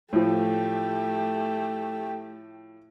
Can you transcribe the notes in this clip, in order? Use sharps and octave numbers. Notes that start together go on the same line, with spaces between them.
A2 F3 A3 G4